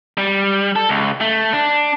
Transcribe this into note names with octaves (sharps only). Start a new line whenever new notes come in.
G3
A4
C#2
A3
D4